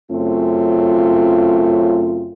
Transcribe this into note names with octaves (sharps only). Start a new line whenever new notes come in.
F#2 C#3 A3 C4 F4